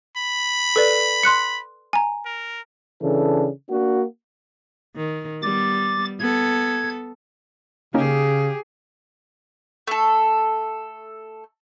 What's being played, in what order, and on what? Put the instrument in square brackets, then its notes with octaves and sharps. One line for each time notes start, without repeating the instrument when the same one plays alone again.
[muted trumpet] B5
[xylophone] A4 B4 D5
C6 F#6 C#7
G#5 A#5
[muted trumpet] A#4
[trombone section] C#3 E3 D4 A4
A#3 D4 F#4
[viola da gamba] D#3
[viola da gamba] G3 B3 [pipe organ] D6 A6
[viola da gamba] B3 A4 [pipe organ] G#6
[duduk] C#3 [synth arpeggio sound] A#3 C#4 D#4 [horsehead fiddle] G4 G#4
[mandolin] A3 A4